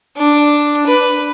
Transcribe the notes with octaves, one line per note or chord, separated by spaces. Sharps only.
D4
B4